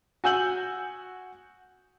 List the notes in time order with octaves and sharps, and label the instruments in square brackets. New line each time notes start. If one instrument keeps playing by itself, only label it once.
[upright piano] F#4 G#5 E6 G6 F#7